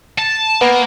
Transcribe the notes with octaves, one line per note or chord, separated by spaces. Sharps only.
A5
A#3 B3